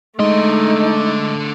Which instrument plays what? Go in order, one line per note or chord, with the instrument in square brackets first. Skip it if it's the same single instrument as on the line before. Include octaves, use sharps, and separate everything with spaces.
[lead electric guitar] D3 C6 [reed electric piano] G#3 D#5 [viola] A3 [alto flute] D#4